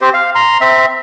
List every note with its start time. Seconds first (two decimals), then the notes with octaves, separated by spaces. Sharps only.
0.01 C4 G4 C5
0.14 F5
0.35 A#5 C6
0.61 C4 E5